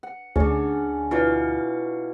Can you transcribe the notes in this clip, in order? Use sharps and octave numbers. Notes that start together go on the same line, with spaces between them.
F#5
D2 C#4 D4 G#4
B2 E4 F4 C#5 D5 F5